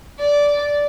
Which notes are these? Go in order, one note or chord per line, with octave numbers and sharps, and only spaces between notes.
D5